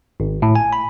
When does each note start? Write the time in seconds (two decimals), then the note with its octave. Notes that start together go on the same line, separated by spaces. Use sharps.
0.20 G#1
0.42 A2
0.56 G#5
0.73 B5